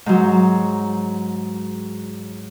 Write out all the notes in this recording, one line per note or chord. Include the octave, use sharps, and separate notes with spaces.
G#2 F#3